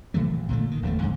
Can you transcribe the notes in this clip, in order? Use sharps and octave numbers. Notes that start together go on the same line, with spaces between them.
C3 E3 F#3 A3
A#1
A#2 D3 F3 A3
D#3
G1 E2 D3 A3
F2 G#2 D3